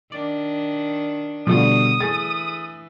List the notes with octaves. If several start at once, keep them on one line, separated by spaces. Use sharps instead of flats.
D#3 D4 D5
B2 D3 F3 G3 A3 F4 D#6
E3 A3 G#4 A6